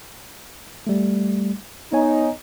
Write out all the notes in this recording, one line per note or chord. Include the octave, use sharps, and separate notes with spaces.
G3 A3
B3 D#4 C#5 G#5